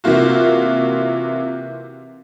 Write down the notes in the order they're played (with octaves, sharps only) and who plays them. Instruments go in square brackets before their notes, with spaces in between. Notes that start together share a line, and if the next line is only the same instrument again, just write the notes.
[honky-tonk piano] C3 E3 A#3 F4 F#4